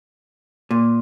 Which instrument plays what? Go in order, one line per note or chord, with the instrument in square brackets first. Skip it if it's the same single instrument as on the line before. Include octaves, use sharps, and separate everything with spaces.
[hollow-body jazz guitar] A#2